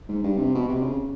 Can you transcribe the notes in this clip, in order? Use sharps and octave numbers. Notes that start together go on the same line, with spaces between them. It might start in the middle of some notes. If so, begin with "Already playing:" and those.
G#2
G2
C3
B2
C3
C#3